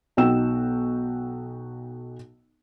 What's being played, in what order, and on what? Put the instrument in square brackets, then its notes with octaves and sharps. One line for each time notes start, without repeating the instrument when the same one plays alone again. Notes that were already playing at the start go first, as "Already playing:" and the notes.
[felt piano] B1 D#4 F#4 G5 E6 E7